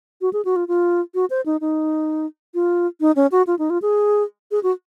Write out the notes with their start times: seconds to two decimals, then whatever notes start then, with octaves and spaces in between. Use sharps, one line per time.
0.21 F#4
0.33 G#4
0.45 F#4
0.56 F4
0.68 F4
1.15 F#4
1.30 C5
1.46 D#4
1.61 D#4
2.54 F4
3.01 D#4
3.16 C#4
3.32 F#4
3.47 F4
3.59 D#4
3.70 F4
3.82 G#4
4.51 G#4
4.63 F#4